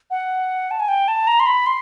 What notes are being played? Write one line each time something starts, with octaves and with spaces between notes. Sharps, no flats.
F#5
A5
G#5
G5
A5
A#5
C6
B5
C6